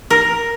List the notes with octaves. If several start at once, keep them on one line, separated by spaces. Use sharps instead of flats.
A#4